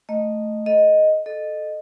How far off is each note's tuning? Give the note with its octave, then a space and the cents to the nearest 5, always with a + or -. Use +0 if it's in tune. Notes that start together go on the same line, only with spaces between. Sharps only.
A3 +0 D#5 -10 A#5 +0
A4 -5 D#5 +0
A4 -5 D#5 -25